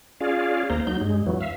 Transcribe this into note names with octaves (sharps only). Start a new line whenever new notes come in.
C#4 F4 G#4 D5 F5
D#2 A#3 C5 A#5
F#3 D#4 G6
G2 G#3
F2 E3 F#3
E5 F5